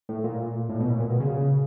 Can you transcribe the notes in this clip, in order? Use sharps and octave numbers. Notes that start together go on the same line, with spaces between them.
A2
A#2
A2
B2
A#2
A#2
B2
C#3